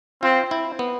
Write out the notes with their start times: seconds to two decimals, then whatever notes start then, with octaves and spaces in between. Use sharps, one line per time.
0.23 C4 F4
0.51 E4
0.79 B3